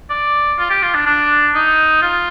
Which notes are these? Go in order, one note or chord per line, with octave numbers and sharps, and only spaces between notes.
D5
F4
G4
F4
D4
D4
D#4
F4